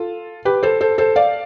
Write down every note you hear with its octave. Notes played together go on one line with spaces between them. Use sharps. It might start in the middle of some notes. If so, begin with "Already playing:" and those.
Already playing: F4 A4
G4 B4
A4 C5
A4 C5
A4 C5
D5 F5